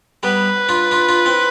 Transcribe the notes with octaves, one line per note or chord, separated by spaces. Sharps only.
G3 B3 B4
D4 F4
D4 F4
D4 F4
C4 E4